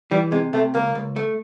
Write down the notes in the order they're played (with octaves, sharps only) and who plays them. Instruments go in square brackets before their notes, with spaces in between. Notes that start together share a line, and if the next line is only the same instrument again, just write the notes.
[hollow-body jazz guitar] E3 [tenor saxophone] G3
[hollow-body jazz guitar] C3 [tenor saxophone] G#3
[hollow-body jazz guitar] C3 [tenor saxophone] A3
[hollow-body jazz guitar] C#2 [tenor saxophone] A#3
[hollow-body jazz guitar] C#2
A3